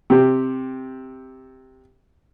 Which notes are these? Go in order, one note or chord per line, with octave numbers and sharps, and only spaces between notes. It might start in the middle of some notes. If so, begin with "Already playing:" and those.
C3 G4